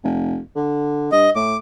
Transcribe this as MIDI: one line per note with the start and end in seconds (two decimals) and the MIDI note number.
0.04 0.39 29
0.56 1.11 50
1.12 1.28 43
1.12 1.30 75
1.35 1.57 45
1.35 1.57 86